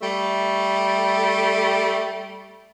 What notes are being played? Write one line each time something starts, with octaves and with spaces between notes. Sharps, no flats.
G3 A3